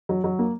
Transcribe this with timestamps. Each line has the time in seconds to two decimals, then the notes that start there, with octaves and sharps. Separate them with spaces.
0.09 F#3
0.24 F#3
0.39 A#3